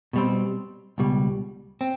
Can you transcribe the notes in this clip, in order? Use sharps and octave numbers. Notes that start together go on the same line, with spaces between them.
B2 G3 C4
C#2 B2 G3
C4